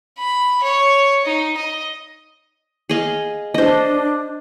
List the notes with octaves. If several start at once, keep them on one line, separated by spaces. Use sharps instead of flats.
B5
C#5
D#4
D#5
G#4 D#5 F5
D4 C5 D#5